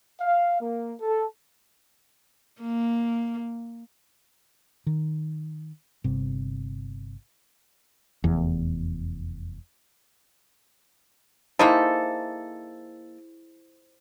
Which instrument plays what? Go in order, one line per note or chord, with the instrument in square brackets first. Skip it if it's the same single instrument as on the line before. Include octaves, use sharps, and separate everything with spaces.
[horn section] F5
A#3
A4
[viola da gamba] A#3
[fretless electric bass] D#3
G1 C3
F1 E2
[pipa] A#3 D#4 A4 [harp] E4 G#4 C5